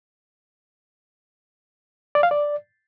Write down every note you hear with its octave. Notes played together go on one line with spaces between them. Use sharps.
D5
F5
D5